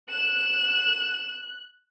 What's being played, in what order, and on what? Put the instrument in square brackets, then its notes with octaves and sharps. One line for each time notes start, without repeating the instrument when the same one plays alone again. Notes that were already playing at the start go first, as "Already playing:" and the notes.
[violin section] F#6 [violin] E7